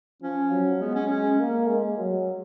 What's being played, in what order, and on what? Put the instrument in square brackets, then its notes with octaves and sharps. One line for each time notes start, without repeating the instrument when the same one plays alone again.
[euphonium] F3 [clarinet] C#4
[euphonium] F#3
[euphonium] G#3 [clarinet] B3
[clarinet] C#4
[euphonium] G#3 [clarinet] C#4
[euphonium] A#3
G#3
F#3